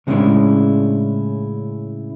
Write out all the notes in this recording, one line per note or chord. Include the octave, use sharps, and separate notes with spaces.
A2 C#3 G#3 C#4 D4 E4